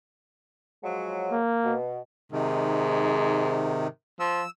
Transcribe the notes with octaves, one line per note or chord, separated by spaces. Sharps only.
F3 F#3 G#3
A#3
B2
G#2 C3 D#3
F3 E6